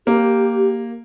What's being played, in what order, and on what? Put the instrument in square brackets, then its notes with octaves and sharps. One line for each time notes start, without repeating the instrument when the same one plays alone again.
[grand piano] A#3 [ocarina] G4